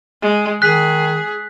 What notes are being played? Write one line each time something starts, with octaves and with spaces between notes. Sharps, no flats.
G#3
D#3 G#4 F#6 B6